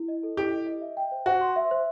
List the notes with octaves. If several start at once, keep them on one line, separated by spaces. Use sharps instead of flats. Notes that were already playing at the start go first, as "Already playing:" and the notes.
Already playing: E4
D#5
A4
E4 G4
D#5
D#5
E5
G5
C5
F#4 C5
C6
E5
C5